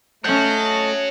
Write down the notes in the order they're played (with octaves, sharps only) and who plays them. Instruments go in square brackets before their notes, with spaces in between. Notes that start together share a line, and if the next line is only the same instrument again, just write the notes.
[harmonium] A3 [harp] C#4 G6 [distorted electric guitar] C#5 F#5 [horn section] D#5 A5